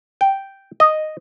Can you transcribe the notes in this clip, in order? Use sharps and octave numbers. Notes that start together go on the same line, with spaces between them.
G5
D#5